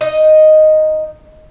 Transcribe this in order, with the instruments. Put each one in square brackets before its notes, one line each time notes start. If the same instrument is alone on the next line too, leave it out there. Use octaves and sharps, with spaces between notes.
[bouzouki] D#4 D#5